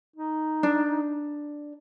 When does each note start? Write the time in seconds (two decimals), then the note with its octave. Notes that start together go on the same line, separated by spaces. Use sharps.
0.16 D#4
0.63 D4